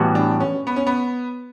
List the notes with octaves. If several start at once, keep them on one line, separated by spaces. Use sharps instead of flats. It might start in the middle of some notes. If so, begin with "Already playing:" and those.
Already playing: A2 E3 G3 B3 F#4
D4
C#4
B3
C#4
B3